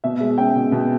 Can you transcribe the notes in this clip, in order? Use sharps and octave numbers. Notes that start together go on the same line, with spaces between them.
B2 E5
G#3
C#4 G5
B2
B2